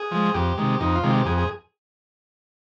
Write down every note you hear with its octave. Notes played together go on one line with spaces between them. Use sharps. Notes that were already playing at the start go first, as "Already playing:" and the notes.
Already playing: G#4
F3 G#3
F2 G4
C3 D#3 G#3
F2 D#4
F4
C3 D#3 G#3
G4
F2 G#4
G#4